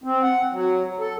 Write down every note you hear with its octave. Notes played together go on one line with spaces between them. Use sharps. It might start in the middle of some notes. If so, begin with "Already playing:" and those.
C4
F#5
F#3
A4